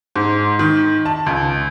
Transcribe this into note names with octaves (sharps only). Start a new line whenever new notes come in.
G#2
D#3
A5
C#2